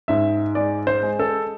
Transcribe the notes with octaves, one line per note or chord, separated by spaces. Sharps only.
G#2 E5
G#3 D5
C5
G#3
A4